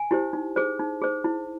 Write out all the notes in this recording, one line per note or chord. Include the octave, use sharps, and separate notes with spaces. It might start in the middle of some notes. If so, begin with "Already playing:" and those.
Already playing: G#5
E4 G4 C5
D#4
G#4 C5
D#4
G#4 C5
E4